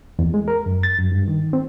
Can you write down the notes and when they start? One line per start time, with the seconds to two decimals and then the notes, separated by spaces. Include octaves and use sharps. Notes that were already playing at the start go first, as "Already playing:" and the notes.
0.19 E2
0.34 G#3
0.48 A#4
0.66 F#2
0.83 A6
0.98 F#2
1.12 G2
1.28 D#3
1.53 C4